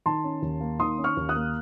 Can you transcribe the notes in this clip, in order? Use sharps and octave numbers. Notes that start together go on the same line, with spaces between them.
D#3 A5 C6
C#4
D#2
A#3
D#3 C6 D#6
C#4
C#6 F6
D#2
D#6 F#6
A#3